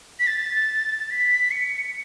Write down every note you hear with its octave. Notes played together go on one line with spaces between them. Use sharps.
B6
A6
A6
B6
C#7